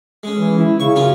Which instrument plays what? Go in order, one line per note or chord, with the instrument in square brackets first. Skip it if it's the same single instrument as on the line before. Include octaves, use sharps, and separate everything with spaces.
[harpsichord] G#3 C#4
[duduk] E3
E4
[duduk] C#3 [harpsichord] C#6
[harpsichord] F#2 C#4 F4